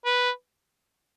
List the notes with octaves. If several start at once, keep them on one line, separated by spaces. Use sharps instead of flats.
B4